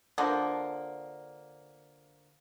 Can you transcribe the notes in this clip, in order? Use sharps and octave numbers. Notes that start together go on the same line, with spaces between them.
D3 F3 A#3